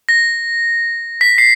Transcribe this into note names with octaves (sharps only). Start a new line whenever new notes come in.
A#6
B6
C7